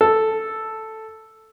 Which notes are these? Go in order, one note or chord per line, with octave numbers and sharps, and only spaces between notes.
A4